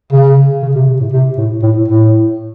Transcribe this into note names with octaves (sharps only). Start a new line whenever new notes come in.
C#3
C#3
C3
C3
A2
C3
A2
A2
A2